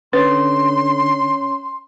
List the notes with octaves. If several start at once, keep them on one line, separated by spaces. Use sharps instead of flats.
D3 C#4 B4 C#5 C6